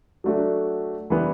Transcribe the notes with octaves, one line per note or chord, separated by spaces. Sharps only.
F#3 A3 D4 F#4
E3 G3 B3